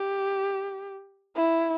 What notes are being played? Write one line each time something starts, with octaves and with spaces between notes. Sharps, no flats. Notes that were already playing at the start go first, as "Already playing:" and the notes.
Already playing: G4
E4